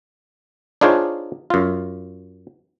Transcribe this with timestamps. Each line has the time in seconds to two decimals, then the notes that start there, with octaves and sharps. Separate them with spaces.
0.81 D4 D#4 F4 G#4 C5 C#5
1.50 F#2 F4